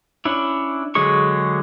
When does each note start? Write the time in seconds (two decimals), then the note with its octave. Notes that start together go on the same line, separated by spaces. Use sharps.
0.25 C#4 D4 E4
0.95 D3 F#3 G#3 G#4 C#6